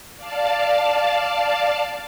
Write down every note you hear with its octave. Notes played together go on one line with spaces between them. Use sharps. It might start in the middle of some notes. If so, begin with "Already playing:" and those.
D5 F5 A5